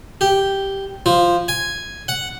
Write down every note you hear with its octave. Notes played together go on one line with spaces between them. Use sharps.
G4
F3
G#5
F#5